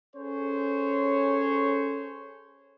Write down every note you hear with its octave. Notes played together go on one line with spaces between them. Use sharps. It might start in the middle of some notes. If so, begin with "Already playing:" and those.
C#4 G#4 A4 C5 C#5